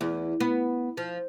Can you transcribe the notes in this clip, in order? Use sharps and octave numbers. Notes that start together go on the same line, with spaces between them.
E2
B3
F3